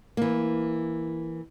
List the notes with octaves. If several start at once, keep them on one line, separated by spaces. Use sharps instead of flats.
E3 A#3